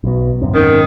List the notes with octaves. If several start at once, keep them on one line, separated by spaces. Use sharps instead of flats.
B1 B2
D1 F#2 C4
G#2 D#3 C#4